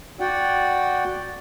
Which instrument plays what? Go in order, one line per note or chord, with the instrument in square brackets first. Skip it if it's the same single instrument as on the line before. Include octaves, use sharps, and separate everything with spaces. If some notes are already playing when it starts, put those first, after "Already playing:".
[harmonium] F#4 D5 F#5 G5